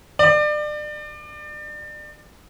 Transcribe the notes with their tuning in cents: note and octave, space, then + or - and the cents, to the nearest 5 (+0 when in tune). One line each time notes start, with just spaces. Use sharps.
D5 +30